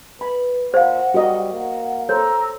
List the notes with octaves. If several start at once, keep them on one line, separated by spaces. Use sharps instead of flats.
B4 B5
A#2 C5 F5 F#5
G3 F#4 A#4 D#5
A#3 F#5
A4 C5 C#5 A#5 E6